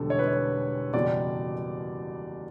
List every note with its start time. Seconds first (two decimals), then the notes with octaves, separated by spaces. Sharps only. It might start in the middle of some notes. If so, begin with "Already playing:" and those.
Already playing: E1 E2 D3 G3 A4
0.10 C#5
0.19 B4
0.28 C#5
0.94 F#1 E2 B2 G3 D5